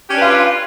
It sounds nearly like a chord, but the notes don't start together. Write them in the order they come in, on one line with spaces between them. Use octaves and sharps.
G4 C#4 D4 B4 F4